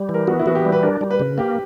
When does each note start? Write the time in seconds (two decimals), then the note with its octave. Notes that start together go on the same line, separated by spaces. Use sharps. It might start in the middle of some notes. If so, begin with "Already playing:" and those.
Already playing: G3
0.09 E3
0.14 A#4
0.28 B3 F#4
0.39 E4
0.46 E3 F#4
0.55 G4
0.65 G3
0.72 B4
0.83 D4 A#4
1.01 G3
1.11 B4
1.20 C#3
1.38 A#3 G4